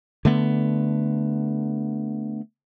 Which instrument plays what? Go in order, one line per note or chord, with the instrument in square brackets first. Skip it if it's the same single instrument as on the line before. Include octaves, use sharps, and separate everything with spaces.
[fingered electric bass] D3 A3 B3